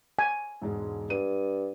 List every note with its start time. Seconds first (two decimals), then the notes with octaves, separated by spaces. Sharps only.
0.19 G#5
0.62 E1 G#2 G#3
1.10 G2 D#7